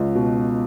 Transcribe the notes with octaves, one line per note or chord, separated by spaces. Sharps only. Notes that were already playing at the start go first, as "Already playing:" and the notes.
Already playing: C#2
B2